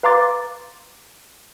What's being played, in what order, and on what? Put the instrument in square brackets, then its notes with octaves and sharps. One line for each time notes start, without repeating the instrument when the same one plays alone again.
[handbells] B4 F5 A#5 C6 D6 A6